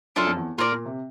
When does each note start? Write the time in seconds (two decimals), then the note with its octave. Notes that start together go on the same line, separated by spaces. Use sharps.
0.16 F#2 D4 F4 A4
0.27 F2
0.37 E2
0.58 A#2 F4 A#4 D5
0.72 A#2
0.85 C3